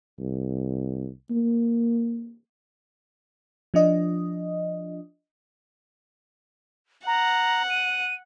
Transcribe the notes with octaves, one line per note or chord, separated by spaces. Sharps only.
C2
A#3
F3 D4 D#5
F#5 A#5
D#7